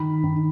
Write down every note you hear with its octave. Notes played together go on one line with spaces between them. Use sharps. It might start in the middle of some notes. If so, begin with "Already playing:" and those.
Already playing: D#3 B5
D#3